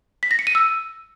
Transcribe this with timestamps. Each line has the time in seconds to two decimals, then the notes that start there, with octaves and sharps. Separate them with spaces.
0.23 B6
0.31 A#6
0.39 C#7
0.47 D#7
0.55 E6